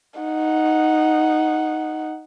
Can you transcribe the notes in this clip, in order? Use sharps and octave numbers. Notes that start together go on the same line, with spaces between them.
D#4 F#5